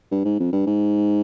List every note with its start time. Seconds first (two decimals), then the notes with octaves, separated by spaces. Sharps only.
0.11 G2
0.25 G#2
0.39 F2
0.53 G2
0.67 G#2